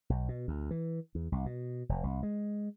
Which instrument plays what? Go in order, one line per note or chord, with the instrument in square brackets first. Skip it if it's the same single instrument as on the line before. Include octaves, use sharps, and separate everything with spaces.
[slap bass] B1
B2
D2
E3
E2
C2
B2
F1
C2
G#3